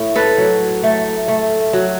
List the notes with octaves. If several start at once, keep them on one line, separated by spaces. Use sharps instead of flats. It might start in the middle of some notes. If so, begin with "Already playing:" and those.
Already playing: A2
A4 B4
F#3
A3
A3
F#3